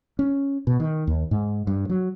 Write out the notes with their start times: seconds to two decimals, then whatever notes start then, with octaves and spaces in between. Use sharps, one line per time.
0.19 C#4
0.67 B2
0.80 D#3
1.07 D#2
1.31 G#2
1.67 G2
1.90 F#3